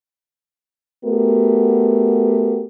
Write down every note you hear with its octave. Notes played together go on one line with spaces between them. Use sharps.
A3 B3 F#4 G4 A#4